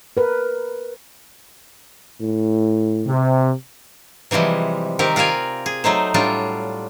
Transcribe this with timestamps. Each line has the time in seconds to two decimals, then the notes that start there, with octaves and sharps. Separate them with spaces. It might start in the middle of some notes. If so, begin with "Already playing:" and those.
0.17 A#4 B4
2.20 A2
3.07 C3
4.31 C3 E3 F3 G3 G#3
4.99 D#3 C4 G4 A#4
5.16 F4 A#4 D5 F5 G#5
5.66 G#4
5.84 F#3 A3 D#4 C5
6.14 A2 F#3 G3 D4 F4